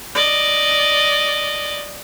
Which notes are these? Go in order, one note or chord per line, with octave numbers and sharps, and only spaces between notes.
D5 D#5